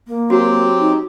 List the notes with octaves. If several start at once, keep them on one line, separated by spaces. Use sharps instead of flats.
A#3
F#3 C4 F#4 G4
D#4